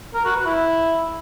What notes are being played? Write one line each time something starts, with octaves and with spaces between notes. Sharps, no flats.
A#4
F#4
B4
E4